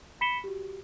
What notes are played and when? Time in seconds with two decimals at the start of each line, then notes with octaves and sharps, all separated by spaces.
0.21 B5 B6 C#7 E7 G7
0.44 F#4 G4